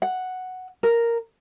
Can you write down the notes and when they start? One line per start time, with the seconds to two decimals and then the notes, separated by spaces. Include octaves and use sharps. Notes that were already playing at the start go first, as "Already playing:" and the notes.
0.02 F#5
0.83 A#4